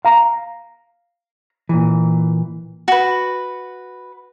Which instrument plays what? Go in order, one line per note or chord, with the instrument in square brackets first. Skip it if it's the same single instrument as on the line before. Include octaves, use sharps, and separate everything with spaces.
[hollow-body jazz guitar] F5 A#5
A#2 E3
[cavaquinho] F#4 B4